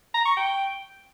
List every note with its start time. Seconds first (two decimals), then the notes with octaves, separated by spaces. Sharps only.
0.14 A#5
0.25 C#6
0.37 G5